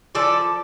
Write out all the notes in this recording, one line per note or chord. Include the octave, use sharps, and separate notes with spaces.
F3 A4 D5